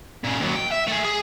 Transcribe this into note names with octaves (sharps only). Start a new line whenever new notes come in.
A#2 C#3
D#2 F#3
G5
E5
A3 G#4
G#4